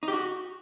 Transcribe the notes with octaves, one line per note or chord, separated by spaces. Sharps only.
D#4
G4
F#4